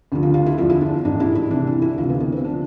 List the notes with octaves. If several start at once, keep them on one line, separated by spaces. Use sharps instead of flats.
D2 D3 F3
F4
F4
E4
E2 D3 F3 F4
E4
D4
A1 G#2 E3 D4
E4
E4
C2 C3 E3 D4
E4
E4
D2 C3 E3 F4
B3
B3
C4
D3 F3 D4